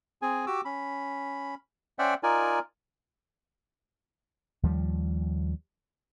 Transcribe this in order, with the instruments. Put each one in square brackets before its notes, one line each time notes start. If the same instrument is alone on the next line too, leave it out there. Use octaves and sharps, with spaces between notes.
[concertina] C4 G#4 G#5
F#4 G4 D6 E6
C#4 B5
C#4 C5 D5 E5 F#5 G5
D#4 F4 A#4 D5 G#5
[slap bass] D#2 F3 G3